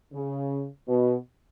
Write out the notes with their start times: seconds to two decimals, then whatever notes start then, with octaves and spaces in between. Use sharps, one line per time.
0.13 C#3
0.88 B2